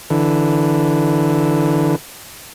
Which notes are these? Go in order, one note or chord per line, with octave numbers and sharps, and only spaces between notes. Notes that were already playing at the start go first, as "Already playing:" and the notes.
D3 E3